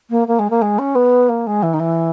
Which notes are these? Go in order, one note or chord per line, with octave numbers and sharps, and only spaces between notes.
A#3
A#3
G#3
A#3
G#3
C#4
B3
A#3
G#3
E3
D#3
E3